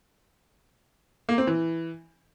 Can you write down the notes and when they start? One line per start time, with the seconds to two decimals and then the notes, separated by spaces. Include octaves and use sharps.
1.29 A#3
1.38 C4
1.47 E3